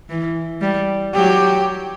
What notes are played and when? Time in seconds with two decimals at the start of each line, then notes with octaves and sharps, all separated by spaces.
0.09 E3
0.61 G3
1.14 F#3 G4